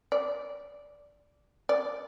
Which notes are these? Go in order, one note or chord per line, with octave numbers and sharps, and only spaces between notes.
D5
D5